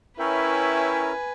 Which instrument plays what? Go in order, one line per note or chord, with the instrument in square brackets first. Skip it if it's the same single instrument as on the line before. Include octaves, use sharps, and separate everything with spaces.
[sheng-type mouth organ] C#4 A#4 [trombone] E4 [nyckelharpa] B4 G#5 [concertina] C#5 E5 G5